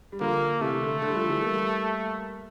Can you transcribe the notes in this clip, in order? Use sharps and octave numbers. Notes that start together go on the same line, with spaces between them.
G3
D3 F3 A#3
C3 E3 A3
D3
D3
G3
D3 F3
E3 G3
G3 A#3